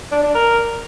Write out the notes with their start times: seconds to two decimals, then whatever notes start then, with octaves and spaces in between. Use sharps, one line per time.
0.11 D4
0.23 D4
0.35 A#4